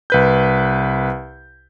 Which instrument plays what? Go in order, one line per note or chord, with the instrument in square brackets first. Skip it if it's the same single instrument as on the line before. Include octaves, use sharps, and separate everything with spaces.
[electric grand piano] C2 B4 G6